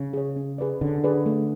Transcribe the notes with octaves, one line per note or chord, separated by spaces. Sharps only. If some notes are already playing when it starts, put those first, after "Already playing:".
Already playing: C#3
G#4 C#5
C#4
G#4 B4 D5
D3 C#4
G#4 B4 D5
A3